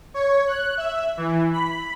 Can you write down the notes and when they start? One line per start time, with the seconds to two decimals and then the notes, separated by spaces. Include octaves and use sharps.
0.14 C#5
0.48 F#6
0.77 E5
1.17 E3
1.53 B5